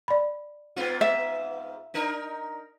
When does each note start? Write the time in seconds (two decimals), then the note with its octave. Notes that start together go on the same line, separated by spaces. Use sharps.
0.08 D5 B5
0.76 G#2 B3 F4
1.01 E5
1.94 D4 D#4 A#4